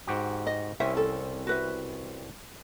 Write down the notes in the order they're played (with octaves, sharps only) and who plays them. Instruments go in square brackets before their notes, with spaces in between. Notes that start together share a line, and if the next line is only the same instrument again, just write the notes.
[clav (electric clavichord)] G#2 F#4 G4
[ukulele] D#5
[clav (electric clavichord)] C2 C4 C#4 [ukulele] E5
[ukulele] A4
F#4 B4 E5